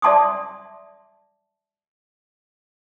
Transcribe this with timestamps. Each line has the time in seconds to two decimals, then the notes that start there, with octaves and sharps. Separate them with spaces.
0.02 D5 E5 A5 C6 D6 D#6